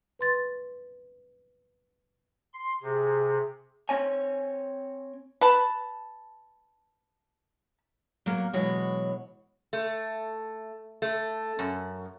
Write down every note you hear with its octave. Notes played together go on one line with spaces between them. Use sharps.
B4 C6 A6
C6
C3 G#4
C4 C#5 G#5
B4 A5
F#3 A#3
B2 E3 F#3 G#3 F#4 C#5
A3
A3
F#2